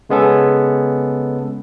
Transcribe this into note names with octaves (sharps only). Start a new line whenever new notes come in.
C#3 G#3 B3 C#4 A4